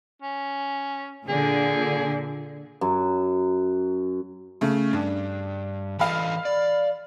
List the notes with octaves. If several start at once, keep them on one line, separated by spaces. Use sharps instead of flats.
C#4
A#2 D3 G#4
F#2
C#3 A3
G2 D4
E3 A4 D#5 F5 B5
D5